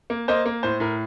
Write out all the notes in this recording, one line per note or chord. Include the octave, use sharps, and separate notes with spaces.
A#3
A#3 C5 D#5
A#3
A2 C5
A2 A#4